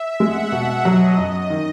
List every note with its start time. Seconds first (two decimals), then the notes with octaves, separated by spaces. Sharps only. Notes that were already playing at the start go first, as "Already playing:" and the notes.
Already playing: E5
0.20 G#3 F#5
0.52 B2 E5
0.85 F#3 D#5
1.18 F#2
1.50 D#3